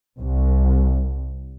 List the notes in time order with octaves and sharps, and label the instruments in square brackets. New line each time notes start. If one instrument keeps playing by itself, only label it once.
[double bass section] C2